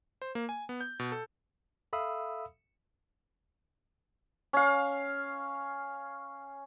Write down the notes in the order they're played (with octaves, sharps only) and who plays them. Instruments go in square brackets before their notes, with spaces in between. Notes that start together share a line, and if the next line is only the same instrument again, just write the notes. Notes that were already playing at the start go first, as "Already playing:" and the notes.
[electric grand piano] C5
A#3
G#5
B3
G6
B2
A4
[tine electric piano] A4 E5 F5 B5 D#6 E6
[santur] C#4 F5